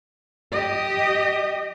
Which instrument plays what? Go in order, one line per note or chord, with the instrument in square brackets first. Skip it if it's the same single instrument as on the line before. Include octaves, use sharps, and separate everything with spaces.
[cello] G4 D#5